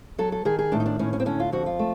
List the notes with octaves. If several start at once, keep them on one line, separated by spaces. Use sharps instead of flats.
F#3 A4
A4
D#3 G#4
G#4
A2 D4
D#4
D4
A2 C#4
C#4
C4
D3 C#4
F4
F2 F#4
F4
A3